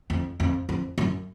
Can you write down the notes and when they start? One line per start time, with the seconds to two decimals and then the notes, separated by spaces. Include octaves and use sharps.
0.10 F2
0.40 F2
0.69 F2
0.98 F#2